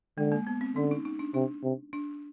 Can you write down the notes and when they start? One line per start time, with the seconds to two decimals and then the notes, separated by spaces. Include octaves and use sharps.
0.18 D3 G#3
0.32 A#3
0.47 B3
0.61 C4
0.76 D3 C#4
0.91 D#4
1.05 D#4
1.19 D4
1.34 C3 D4
1.64 C3
1.93 D4